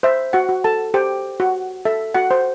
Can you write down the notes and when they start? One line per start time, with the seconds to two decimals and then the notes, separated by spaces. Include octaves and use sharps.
0.03 C5 E5
0.33 F#4 F#5
0.49 F#4
0.64 A4 A5
0.94 G4 C5 G5
1.40 F#4 F#5
1.85 A4 E5
2.14 F#4 F#5
2.31 C5